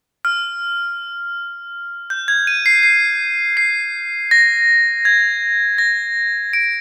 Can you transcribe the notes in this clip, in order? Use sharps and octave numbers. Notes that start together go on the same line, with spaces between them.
F6
G6
G#6
D#7
C7
C7
C7
A#6
G#6
A#6
D7